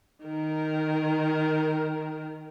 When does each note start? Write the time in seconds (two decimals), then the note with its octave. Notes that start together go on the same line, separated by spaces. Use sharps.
0.23 D#3 A#4